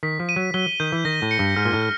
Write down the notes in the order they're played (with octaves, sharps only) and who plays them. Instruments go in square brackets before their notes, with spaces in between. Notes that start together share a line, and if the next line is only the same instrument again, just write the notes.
[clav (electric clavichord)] D#3 [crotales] B6
[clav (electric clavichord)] F3
[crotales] D#7
[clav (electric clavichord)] F#3
[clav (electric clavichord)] F#3 [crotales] G7
[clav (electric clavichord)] D#3 [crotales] G6
[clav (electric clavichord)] E3
[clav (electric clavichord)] D#3 [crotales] A#6
[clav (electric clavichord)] A2
[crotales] C#7
[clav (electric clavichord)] G2
[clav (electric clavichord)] G#2 [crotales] F6
[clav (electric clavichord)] A#2
A2
[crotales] F6